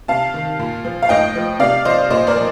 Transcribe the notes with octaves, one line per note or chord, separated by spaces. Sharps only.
C3 F5 A5
D#3
A#2
F3
F5
A2 D#5 G5
F3
C3 D5 F5
F3 C5 D#5
A#2 C5 D#5
A#4 D5
F3